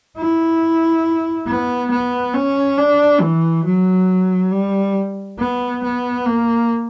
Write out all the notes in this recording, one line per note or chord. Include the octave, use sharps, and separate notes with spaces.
E4
B3
B3
C#4
D4
E3
F#3
G3
B3
B3
A#3